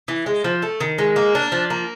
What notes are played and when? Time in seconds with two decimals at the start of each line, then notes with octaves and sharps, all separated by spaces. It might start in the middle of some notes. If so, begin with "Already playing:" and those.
0.08 E3
0.26 G#3
0.44 F3
0.62 A3
0.81 D#3
0.98 G#3
1.16 A#3
1.35 D4
1.52 F3
1.70 A#3